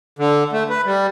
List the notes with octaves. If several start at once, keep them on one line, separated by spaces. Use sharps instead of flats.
D3
A3
B4
G3